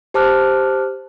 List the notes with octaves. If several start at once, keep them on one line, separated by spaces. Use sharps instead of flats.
G4 C5 A5 D6 F6 F#6